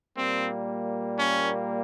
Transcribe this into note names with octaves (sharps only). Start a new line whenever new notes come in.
A#2 G3 A#3 C4
C#4